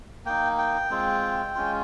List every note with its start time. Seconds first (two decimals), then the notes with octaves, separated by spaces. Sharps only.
0.25 A#3 D#4 G5
0.58 G5
0.90 G#3 C4 F4
1.55 G#3 C#4 F4